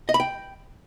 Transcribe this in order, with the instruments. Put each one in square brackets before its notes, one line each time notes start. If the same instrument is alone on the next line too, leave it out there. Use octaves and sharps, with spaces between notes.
[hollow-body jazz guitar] D#5
B5
G5